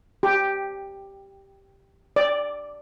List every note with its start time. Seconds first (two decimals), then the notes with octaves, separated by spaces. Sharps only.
0.23 G4
2.16 D5